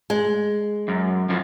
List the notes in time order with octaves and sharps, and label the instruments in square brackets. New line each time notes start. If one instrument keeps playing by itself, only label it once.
[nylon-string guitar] G#3
[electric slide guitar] F#2
F#2 F3